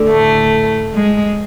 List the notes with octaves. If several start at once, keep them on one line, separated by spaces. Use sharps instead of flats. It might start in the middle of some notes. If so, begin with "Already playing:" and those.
Already playing: D2 D3
A2 A3
G#3